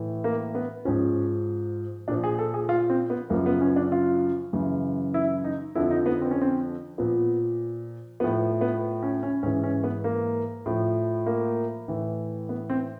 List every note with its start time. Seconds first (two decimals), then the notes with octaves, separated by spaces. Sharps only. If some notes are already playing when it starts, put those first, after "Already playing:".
Already playing: A2 E3
0.24 A#3
0.55 B3
0.85 G#2 F3 C#4
2.08 A#2 F3 D4
2.24 G#4
2.39 A4
2.54 G#4
2.69 F4
2.90 C4
3.10 B3
3.30 F#2 C#3 F3 A#3
3.46 B3
3.61 C#4
3.76 D4
3.92 F4
4.53 F#2 C#3 E3
5.14 E4
5.44 D#4
5.75 F2 D3 F3 E4
5.91 D#4
6.06 B3
6.21 C4
6.31 C#4
6.41 C4
6.98 A#2 F3 B3
8.20 A2 F3 B3
8.61 B3
9.02 C#4
9.23 C#4
9.43 G#2 E3 C#4
9.63 C#4
9.84 B3
10.04 A#3
10.66 A2 F3
11.27 A#3
11.88 A2 E3
12.49 B3
12.70 C4